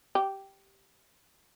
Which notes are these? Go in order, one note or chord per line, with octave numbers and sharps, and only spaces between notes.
G4